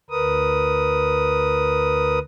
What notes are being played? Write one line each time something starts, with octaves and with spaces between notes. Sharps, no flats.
D2 A#4 B4 D#6